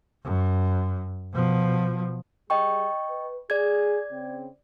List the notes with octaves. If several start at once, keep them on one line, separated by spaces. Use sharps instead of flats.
F#2
B2 F3
G3 G#4 D#5 G5 C#6
B4
G#4 D5 G#6
C#3 C4